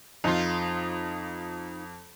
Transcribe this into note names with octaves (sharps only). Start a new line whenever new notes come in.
F2 D#4 F4